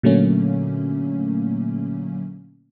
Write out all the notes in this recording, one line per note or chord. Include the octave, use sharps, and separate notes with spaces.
A#2 D3 F#3 A3 A#3 C#4